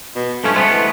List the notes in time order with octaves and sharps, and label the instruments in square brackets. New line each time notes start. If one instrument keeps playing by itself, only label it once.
[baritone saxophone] B2
[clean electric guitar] G2 F3 C#4 [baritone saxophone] A3
[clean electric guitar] G#3 A3 B3 [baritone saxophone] C4
[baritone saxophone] E3